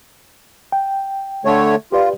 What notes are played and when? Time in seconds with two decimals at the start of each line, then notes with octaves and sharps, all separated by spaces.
0.72 G5
1.45 D3 A3 C#5
1.92 F4 G4 B4 D5